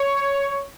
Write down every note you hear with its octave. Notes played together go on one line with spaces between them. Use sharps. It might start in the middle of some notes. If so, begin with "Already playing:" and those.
Already playing: C#5